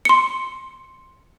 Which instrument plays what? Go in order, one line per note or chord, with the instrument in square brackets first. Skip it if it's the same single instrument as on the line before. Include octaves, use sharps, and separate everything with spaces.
[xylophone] C6 C#7